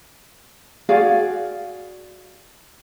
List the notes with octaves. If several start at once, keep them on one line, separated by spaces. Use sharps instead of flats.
F#4 G#4 D5 F5